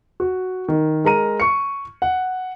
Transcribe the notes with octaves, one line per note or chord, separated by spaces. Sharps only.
F#4
D#3
G#3 A#4 A#5 D#7
C#6 C#7
F#5